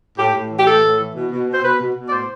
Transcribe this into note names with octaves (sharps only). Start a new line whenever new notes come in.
A2 G4
A2
E3
G4
A2 A4
A2
E3
B2
B2
B2
C5
B2 B4
B2
B2
D5
A2 C5